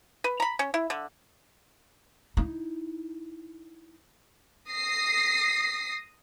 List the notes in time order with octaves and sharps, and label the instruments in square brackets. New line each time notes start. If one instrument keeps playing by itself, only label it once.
[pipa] B4
A#5 B5
C#4
E4
D3
[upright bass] D#4 E4
[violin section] D#6 A#6 C7